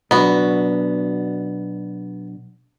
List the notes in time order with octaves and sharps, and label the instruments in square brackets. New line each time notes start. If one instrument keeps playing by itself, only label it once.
[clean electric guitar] B2 F#3 D4 [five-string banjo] B3 F#4